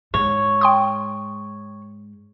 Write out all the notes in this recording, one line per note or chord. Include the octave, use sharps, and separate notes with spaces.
G#2 C#5
G5 C6 D#6